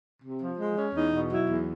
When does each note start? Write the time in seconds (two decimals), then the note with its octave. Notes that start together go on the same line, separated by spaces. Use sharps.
0.23 C3
0.41 F3
0.59 G#3
0.77 C#4
0.95 E2 D#4
1.13 B2
1.31 F#3 E4
1.49 E2